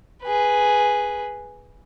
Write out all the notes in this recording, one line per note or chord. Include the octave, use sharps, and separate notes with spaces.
G#4 B4